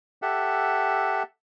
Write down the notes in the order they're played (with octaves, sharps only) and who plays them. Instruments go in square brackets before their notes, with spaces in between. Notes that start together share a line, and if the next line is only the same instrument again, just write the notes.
[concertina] G4 A4 E5 F#5